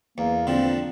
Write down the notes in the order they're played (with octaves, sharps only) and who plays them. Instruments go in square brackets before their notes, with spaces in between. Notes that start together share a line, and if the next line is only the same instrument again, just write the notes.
[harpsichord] E2 [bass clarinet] A#3
[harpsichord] D3 F3 [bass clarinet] C4